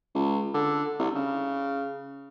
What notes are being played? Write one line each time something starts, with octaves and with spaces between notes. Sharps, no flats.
C#2
D3
C2
C#3